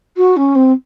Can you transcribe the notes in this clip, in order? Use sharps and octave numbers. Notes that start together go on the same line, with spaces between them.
F#4
C#4
C4